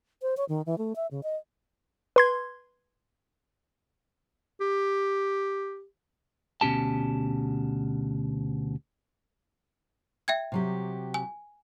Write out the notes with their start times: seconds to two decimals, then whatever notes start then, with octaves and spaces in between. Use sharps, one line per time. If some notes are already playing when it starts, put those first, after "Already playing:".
0.22 C5
0.37 C#5
0.49 D#3
0.66 E3
0.78 A3
0.96 E5
1.11 C#3
1.23 D#5
2.16 B4 C6 G#6
4.61 G4
6.61 D2 B2 C#4 G4 A5
10.28 E5 G5 G#6
10.52 C3 F#3 G4
11.14 G#5